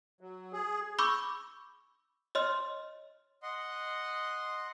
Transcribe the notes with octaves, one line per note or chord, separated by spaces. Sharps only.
F#3
G#4
B5 C#6 D6 E6 G6
C#5 D#5 C6 F6
D#5 F#5 C6